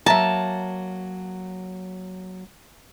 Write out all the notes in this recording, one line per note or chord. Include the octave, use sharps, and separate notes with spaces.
F#3 A#3 E5 A5 A#5